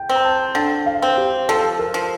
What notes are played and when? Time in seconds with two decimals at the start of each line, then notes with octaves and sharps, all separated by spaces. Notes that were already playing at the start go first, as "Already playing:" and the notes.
Already playing: G5
0.09 C4
0.15 A#5
0.25 A5
0.55 D3 G5
0.86 F5
1.02 C4
1.17 G4
1.49 F3 A4
1.79 A#4
1.94 F3